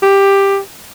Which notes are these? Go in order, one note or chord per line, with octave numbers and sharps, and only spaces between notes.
G4